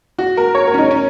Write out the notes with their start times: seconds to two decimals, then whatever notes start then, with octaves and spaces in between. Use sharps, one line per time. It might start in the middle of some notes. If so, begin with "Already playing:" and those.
0.18 F#4
0.37 A#4
0.55 C#5
0.67 A#4
0.74 C#4
0.78 D#4
0.91 C#4